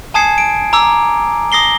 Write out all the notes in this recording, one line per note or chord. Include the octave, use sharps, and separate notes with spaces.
G#5 A5 D#6 G#6 C7 C#7
D7
A#5 D6 E6
D#6 A#6 C7 G7